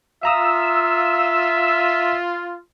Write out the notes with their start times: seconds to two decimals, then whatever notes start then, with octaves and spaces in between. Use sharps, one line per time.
0.23 F4 E5 F5 A#5 D#6 E6